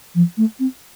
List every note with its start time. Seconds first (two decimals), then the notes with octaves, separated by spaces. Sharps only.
0.15 F3
0.37 A3
0.60 C4